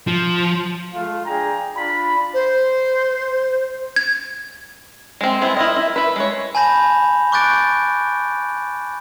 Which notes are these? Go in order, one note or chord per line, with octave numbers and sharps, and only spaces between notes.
F3
G#3 A3 F4
D4 G#4 G5 A#5
D4 F4 B5
C5
G#6
G#3 C4
G#3 B3 C4 E4
E4 F4 D#5
E4
E4 B4
G#3 C#5
G#5 A5 B5 G6 A#6
C#6 D6 F#6 G6 A6 D7